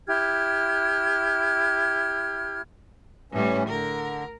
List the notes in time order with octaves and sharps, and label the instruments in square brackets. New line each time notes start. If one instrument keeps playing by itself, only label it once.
[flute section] E4 G4 F6 G#6
[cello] A2 G3 [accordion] E3 C#4
[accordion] D3 [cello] A#4